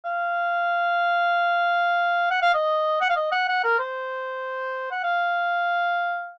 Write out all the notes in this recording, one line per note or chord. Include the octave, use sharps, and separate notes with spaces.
F5
F#5
F5
D#5
F#5
F5
D#5
F#5
F#5
A#4
C5
F#5
F5